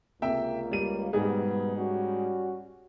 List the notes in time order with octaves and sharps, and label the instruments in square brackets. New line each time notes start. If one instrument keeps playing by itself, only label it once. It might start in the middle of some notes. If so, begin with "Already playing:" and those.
[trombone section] C#2 A#3 [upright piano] C3 E5 G5
[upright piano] G3 D#7
[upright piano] G#2 D#4 G#4 [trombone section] B2 G3 B3
[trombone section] G3 C#4 F#4